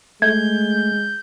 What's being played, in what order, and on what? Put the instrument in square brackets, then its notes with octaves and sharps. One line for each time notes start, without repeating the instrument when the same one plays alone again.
[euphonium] G#3 [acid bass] A3 [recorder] G6 [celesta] G#6